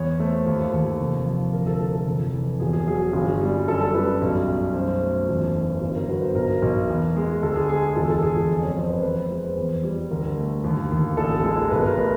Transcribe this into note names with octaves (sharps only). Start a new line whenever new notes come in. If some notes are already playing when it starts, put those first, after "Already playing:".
Already playing: E2 C#5
A3 C5
D#2
D#2
F1
F3
D2 A#4
A4
G#3 A4
A4
F1
E3
E1 G#4
G#4
F#3 G#4
G#4
G1
G3
F#2 A4
A4
G3 B4
B1
B1
F#2 C5
A3
E1
E3
G1
A#4
F#3 B4
C5
B1 A#4
B1
E2
G#3
D2 A4
G#4
G#3 G#4
G#4
E1 A4
A4
E1 G#4
A4
F2
C#5
F2 C5
B4
F2 B4
B4
G#3 C5
B4
E2
G3
D2 A#4
A3
D#2
D#2
A1 A4
G#3 A4
A#4
B1 B4
A#4
A3 B4